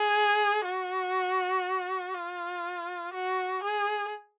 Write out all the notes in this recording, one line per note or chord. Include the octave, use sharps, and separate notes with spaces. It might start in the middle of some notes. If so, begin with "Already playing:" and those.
Already playing: G#4
F#4
F4
F#4
G#4